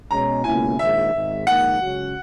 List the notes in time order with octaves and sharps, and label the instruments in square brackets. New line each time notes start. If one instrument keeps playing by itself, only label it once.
[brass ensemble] B2 G#3 C#4 [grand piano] A#5
[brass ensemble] C#2 B2 A#3 C#4 E4 [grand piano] G#5
[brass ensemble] A#1 G#2 D#3 [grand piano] E5
[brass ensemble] G#1 G#2 D#3
[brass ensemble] A#1 G#2 D#3 A#3 D#4 [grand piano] F#5
[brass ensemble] C#2 C#3 F#3 C#4 F#4